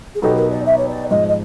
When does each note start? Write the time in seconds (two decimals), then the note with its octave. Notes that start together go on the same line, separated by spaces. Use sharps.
0.15 G#4
0.22 B2 F#3 B3 D#4 G4 A4
0.37 A#4
0.51 D5
0.66 E5
0.77 C#5
0.88 D5
1.10 G#2 F3 G#3 D#5
1.28 D#5